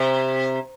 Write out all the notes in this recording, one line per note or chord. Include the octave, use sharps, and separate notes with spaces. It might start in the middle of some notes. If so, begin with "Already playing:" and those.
Already playing: C3